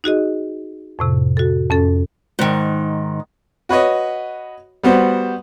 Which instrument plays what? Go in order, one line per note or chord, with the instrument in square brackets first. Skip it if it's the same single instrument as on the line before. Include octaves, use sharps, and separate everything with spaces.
[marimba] D#4 F#4 G#4 D#5
F2 A2 C3
F#4 A4
F2 C#4 A4
[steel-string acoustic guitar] G#2 D#3
[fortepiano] F#4 B4 C#5 D#5
G3 B3 F#4 C5